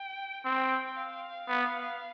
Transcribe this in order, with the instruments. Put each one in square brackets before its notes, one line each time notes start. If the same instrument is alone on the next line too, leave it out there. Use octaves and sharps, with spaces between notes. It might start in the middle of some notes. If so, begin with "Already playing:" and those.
Already playing: [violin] G5
[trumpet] C4 [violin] G5
[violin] F5
[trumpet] B3